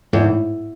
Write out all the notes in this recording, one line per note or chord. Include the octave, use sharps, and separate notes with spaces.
E2 G#2
A2